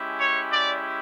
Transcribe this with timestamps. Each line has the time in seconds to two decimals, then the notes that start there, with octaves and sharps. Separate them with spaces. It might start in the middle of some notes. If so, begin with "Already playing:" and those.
Already playing: G#3 C#4 E4 G4
0.20 C#5
0.50 D5